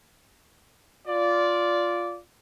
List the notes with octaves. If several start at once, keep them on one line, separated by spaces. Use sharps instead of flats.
F4 D5